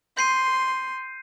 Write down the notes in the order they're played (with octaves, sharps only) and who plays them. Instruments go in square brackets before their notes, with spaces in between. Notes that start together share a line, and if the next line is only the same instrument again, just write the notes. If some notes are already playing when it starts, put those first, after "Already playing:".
[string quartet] C6 [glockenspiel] G6 C7 D#7